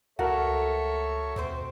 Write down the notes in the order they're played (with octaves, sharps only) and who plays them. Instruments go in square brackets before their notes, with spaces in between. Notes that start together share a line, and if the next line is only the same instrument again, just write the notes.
[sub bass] C#2 [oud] A3 [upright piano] F#4 A#4 [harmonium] A4 C#5 E5
[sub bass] D#2 [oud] B2 C4 C5